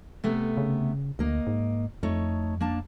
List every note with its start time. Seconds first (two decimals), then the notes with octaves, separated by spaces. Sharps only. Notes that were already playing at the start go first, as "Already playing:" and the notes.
0.24 C3 A3 B3
0.57 C#3
1.19 D2 A#3 D#5
1.47 G#2
2.03 F2 A3 D#4 C#5
2.61 A#3 D4 A5